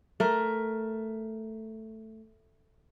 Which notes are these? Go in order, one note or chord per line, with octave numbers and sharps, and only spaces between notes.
A3 A#4